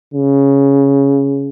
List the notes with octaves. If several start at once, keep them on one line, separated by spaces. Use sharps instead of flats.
C#3